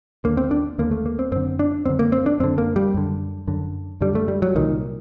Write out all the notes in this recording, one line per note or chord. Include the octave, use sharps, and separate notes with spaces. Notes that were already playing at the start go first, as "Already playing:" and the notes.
D#2 D3 A#3
C4
D4
D#2 D3 A#3
A3
A#3
C4
F#2 D3 C4
D4
F#2 D3 C4
A#3
C4
D4
F#2 D3 C4
A#3
G3
F#2 D3
F#2 D3
F#2 D3 G3
A3
G3
F#3
C2 A#2 D#3